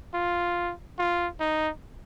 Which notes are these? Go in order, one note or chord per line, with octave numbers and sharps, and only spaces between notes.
F4
F4
D#4